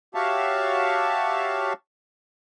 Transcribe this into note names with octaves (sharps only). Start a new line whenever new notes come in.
F#4 G4 C#5 E5 F5 A5